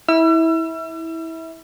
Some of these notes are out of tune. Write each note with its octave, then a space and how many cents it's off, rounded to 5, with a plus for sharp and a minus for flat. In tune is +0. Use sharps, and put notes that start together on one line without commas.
E4 -20 E6 +40